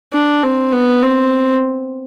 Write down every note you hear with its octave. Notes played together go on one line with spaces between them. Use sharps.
D4
C4
B3
C4